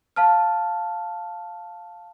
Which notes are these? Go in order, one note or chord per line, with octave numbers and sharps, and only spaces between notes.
F5 A5 F6